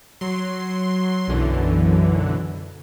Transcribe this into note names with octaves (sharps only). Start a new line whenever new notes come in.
F#3 C6
B1 F#2 D3 E3